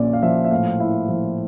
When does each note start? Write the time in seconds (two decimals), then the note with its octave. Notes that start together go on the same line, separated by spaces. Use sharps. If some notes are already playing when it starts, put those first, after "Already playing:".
Already playing: A#1 A#2 C#4 D5
0.13 F5
0.23 F3 E5
0.44 E5
0.51 A2 F5
0.80 E4
1.09 F3